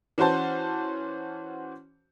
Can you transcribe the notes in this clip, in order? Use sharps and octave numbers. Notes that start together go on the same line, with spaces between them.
E3 C#4 F#4 C5 A5